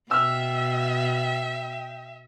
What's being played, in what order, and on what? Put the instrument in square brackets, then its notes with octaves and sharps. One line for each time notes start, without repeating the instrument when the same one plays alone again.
[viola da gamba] B2 [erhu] E5 [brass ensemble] G5 [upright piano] E6 F6